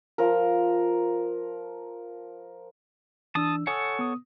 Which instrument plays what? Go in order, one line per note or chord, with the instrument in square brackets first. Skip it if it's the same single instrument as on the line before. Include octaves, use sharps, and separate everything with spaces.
[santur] F3 A#4
[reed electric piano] E3 D4 E6 [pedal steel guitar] A5 D#6
[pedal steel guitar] A4 C#5 F#5 [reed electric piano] G#5 D#6 E6
[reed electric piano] B3 D#6